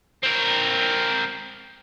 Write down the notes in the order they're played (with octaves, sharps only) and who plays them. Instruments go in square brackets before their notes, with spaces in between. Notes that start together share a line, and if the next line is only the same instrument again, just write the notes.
[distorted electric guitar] C4 A#4